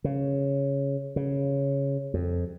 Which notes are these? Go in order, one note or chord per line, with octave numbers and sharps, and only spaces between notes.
C#3
C#3
F2